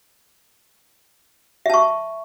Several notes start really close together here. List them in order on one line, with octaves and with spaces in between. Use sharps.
E5 A5 C#6